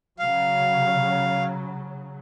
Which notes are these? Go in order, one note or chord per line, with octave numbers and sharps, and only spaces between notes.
C#3 F#3 F5